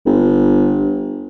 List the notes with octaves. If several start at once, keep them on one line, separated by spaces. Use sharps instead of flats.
G1